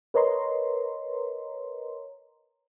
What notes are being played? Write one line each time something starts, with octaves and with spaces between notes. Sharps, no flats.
A#4 B4 C#5 D#5 A#5 C6